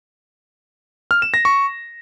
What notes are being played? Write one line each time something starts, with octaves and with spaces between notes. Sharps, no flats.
F6
E7
A#6
C#6